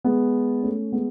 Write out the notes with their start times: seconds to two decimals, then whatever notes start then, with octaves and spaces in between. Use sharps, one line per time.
0.04 G#3 B3
0.63 A3 C#4
0.92 G#3 B3